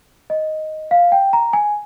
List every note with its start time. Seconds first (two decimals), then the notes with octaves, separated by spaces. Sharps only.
0.30 D#5
0.91 F5
1.12 G5
1.33 A#5
1.53 G#5